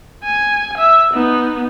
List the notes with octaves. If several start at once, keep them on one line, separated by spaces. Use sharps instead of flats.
G#5
E5
B3 D#4